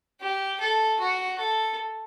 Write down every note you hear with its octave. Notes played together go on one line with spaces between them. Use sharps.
G4
A4
F#4
A4